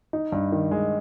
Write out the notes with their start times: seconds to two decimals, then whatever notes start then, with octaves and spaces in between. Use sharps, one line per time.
0.13 D#4
0.32 G2
0.52 D#3
0.71 G#3